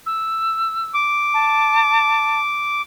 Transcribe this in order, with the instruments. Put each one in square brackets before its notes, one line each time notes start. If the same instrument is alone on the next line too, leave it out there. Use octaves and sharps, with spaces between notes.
[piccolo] E6
[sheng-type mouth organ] D6
[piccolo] A5